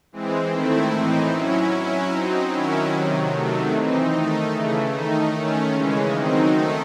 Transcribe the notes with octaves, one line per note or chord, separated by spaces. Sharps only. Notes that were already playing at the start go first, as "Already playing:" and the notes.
E3 G#3 C4
D#3 A3 C4 E4
A2 E3 C4 D#4
F#3 C#4 E4
F#3 C#4 E4
F#3 C4 D#4
D#3 F#3 C#4 E4
C3 D#3 F#3
C3 D#3 F#3 A3
E3 C4 D#4
D#3 A3 D#4
C#3 E3 A3
D#3 A3 D#4
D#3 A3 C#4
C#3 E3 G#3 C#4
D#3 F#3 C4 D#4
D#3 A3 D#4